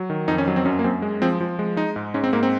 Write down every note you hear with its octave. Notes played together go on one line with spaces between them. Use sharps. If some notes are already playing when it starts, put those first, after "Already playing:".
Already playing: F#3
D#3
F2 D#4
C#4
F#3
C4
F#2 C#4
A#3
F#2 C4
G#3
F3 C4
F3
G#3
G#3 D#4
G#2
G#2 C#4
C4
G#2 A#3
C4